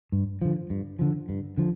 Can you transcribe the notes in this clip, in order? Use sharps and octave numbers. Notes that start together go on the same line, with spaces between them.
G2
D3 F3
G2
D3 F3
G2
D3 F3